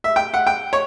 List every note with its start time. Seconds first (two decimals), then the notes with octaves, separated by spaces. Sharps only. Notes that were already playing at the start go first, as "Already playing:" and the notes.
0.04 E5
0.16 G5
0.34 F#5
0.47 G5
0.73 C#5